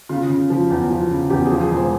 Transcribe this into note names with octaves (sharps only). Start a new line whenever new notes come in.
C#3 F4
C#3
F3
E2
F3
C#3
E2 G4
G#4
F3
G#4
E1
C5